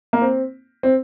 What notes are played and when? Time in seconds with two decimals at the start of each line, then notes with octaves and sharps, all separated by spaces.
0.13 A#3
0.22 C4
0.83 C4